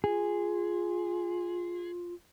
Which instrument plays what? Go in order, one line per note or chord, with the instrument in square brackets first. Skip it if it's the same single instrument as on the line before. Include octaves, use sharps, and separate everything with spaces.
[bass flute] F4 [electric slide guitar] G#4